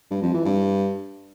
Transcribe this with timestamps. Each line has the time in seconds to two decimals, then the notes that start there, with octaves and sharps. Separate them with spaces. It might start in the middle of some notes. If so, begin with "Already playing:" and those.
0.11 G2
0.22 F2
0.34 E3
0.45 G2